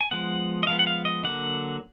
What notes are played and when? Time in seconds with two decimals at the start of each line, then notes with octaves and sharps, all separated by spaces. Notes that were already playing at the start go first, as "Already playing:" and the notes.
0.01 G#5
0.11 F3 G#3 B3 F#5
0.63 D#5
0.67 F3 G#3 B3 F5
0.79 F#5
0.87 F5
1.05 D#5
1.24 D3 F#3 A#3 F#5